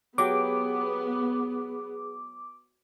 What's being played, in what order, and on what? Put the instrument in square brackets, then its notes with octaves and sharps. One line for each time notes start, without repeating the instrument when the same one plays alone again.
[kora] F#3 G4 [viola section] B3 [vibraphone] G#4 [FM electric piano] D6